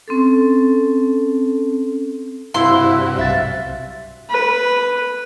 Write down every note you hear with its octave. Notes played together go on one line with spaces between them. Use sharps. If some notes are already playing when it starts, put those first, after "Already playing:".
C4 C#4 A4
G2 C3 E4 F#4 F5 C6
B1 E5 F5 A6
B4